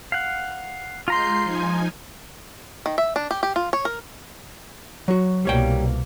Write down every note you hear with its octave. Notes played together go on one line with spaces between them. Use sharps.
F5 F#5
G#3 F4 A#5 C6 G6 C7
F3 D#4 G#5
D#3
E5
D4
G4
G4
F4
C#5
A#4
F#3 F#4
C2 B2 G3 A#3 C#5 G5